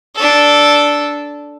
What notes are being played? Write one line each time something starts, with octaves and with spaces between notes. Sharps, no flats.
D4 A4